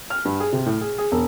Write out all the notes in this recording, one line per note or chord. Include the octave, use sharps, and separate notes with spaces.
F6
G2
G#4
C3
A2
G#4
G#4
E1